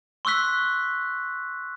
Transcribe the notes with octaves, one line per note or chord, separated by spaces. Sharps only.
C6 C#6 E6 F#6 B6